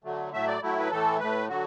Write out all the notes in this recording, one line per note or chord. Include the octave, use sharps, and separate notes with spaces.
D3 F#3 A3
A2 F#3 A3 E5
D5
A2 F#3 A3 E4
B4
A2 E3 A3 A4
A2 A3 B4
D3 F#3 F#4